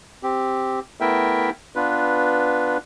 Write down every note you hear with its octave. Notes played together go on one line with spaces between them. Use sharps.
C4 G4
A3 B3 E4 A#4 E5 G5
B3 D4 F4 B4